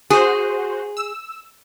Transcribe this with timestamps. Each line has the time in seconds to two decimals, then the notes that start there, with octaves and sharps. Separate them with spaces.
0.10 F#4 G#4 C5
0.97 E6